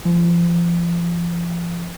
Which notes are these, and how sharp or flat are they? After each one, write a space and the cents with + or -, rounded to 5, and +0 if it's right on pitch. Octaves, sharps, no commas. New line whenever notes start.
F3 -30